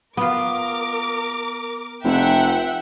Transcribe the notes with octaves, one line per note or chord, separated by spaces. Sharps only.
B3 F4 A#4 D6
F1 E5 F#5 G5